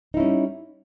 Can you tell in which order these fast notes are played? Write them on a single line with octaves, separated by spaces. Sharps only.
D#4 E4 C#4 G3